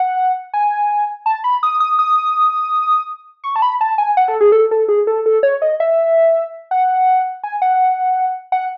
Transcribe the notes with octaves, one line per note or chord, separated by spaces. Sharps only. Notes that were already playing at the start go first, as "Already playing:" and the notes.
Already playing: F#5
G#5
A5
B5
D#6
D#6
D#6
C#6
A5
B5
A5
G#5
F#5
A4
G#4
A4
A4
G#4
A4
A4
C#5
D#5
E5
F#5
G#5
F#5
F#5